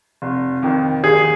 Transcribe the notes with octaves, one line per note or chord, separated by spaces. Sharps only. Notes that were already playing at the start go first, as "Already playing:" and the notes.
F1
F2 D#3
D#2 G#4